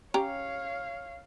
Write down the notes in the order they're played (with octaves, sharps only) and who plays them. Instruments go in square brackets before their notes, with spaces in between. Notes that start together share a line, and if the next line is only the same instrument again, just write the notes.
[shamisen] C#4 G4 A#5 [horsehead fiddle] C#5 F5